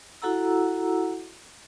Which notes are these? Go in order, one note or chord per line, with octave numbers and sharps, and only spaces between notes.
E4 F#4 A4 F#5 A#5 E6